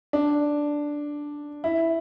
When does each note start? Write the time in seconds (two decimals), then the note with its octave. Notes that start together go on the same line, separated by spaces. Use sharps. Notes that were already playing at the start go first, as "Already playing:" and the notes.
0.13 D4
1.64 E4